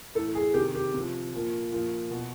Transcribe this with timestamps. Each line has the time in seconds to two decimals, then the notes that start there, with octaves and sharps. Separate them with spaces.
0.15 A2 E3 A4
0.35 G#4
0.54 C3 D#3 G4
0.75 G4
0.94 C3 F3
1.32 A#2 F3
1.72 A#2 F3
2.11 B2